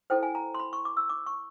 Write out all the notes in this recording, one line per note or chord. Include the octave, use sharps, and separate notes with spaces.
E4 A4 C5 G5
G#5
A#5
C6
B5
C#6
D6
E6
D6
C#6